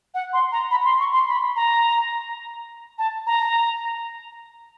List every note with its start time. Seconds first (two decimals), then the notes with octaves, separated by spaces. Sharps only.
0.14 F#5
0.33 C6
0.52 A#5
0.71 B5
0.85 C6
1.00 C#6
1.13 C6
1.28 B5
1.56 A#5
2.98 A5
3.27 A#5